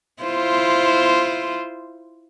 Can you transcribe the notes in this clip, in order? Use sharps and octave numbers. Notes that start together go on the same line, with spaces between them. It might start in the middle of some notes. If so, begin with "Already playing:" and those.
E4 F4 C5